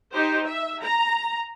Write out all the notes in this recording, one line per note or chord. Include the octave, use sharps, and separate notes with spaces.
D#4 G4 C5
E5
A#5